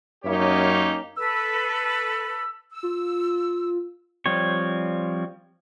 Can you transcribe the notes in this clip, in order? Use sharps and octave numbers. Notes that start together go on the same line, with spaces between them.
F#2 A#3 C#4 D#4 G4 C#5
A4 B4 E6
E6
F4
F3 G3 C4 C#5